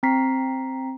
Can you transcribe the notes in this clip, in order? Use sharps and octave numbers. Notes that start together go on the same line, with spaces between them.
C4 A#5 B6 C7